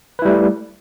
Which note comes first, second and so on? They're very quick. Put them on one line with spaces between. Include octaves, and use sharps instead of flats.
B4 E4 G3 A3